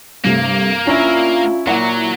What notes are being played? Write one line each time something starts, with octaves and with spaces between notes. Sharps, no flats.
G2 C3 A3 A#3
C#4 D4 E4 F4 A#5 E6
A#2 F#3 E4 F#5 A#5